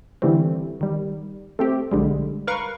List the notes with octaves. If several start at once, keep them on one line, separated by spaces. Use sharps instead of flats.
D3 E3 G3 A3 C4
D#3 G3
A3 C4 G4
B1 D3 G3 G#3
A#4 B4 F5 C#6